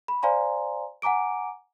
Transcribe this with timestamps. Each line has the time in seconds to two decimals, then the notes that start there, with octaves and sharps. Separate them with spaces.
0.08 B5
0.23 C5 D5 F5 G#5 A#5 C6
1.02 F#5 G#5 A#5 D6 D7